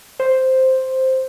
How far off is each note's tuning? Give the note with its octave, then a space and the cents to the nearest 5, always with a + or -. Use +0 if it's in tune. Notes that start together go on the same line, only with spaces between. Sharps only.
C5 +0